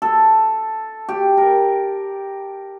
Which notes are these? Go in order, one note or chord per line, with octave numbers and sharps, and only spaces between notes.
A4
G4
A#4